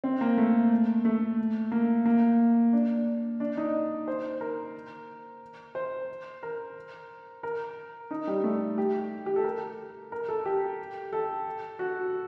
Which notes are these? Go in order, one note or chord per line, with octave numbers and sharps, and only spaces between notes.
C4
A#3
A3
A3
A#3
A#3
D4
D4
D#4
C5
A#4
C5
A#4
A#4
D#4
G3
A3
G4
G4
A4
A#4
A#4
A4
G4
A4
F#4